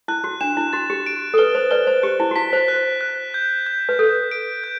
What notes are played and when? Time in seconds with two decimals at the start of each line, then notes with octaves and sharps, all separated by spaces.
0.08 E4 F#6
0.24 F#4
0.41 D4 E7
0.57 E4
0.73 F#4 A6
0.90 G4
1.06 D7
1.34 A4
1.38 B4 G7
1.55 C5
1.71 B4 D5 G7
1.87 C5
2.03 G4 F#6
2.20 E4
2.31 F#4
2.36 E4 B6
2.53 C5
2.68 F#6
3.01 F#6
3.34 G6
3.67 G6
3.89 B4
3.99 A4 G6
4.31 D7
4.64 G6